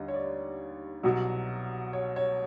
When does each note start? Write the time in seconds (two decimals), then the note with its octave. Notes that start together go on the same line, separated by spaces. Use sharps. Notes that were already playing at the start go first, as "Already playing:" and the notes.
Already playing: D#2 D3 G3 D#5
0.08 C#5
0.14 D5
1.03 C2 B2 F#3
1.93 C#5
2.16 C#5